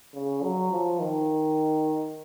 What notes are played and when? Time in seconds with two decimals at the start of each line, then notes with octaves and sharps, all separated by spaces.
0.15 C#3
0.43 F#3
0.72 F3
1.00 D#3